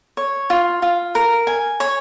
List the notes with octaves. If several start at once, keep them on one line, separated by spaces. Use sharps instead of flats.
C#5
F4
F4
A#4
G#5
C#5